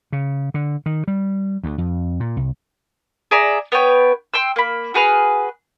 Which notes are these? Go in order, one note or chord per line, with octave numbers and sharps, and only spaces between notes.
C#3
D3
D#3
G3
D2
F2
A#2
C2
G#4 D5 E5 A#5
B3 B4 C#5 G5
G5 C6 E6
A#3 B5
F#4 G#4 B4 F6